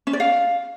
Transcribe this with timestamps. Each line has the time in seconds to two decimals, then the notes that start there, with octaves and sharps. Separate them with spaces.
0.07 C#4
0.13 D5
0.20 F5